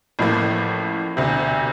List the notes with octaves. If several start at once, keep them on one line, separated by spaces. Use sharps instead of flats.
A1 A2 F3 A#3
E1 D2 C3